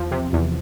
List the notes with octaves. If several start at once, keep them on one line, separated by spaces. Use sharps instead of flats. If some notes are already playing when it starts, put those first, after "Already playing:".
Already playing: E2 F3
C3
E2